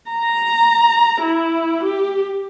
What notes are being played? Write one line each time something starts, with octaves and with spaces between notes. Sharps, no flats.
A#5
E4
G4